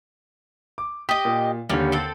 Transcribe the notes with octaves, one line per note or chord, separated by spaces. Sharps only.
D6
G4 D#5 D#6
A#2
D#2 D3 G3 C#4
C4 A4